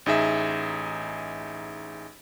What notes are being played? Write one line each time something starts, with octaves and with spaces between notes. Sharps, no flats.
A1 D#4 G#4 E5